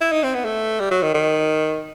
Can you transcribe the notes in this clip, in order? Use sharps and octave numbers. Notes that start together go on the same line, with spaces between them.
E4
D#4
C4
B3
A3
G3
F#3
D#3
D#3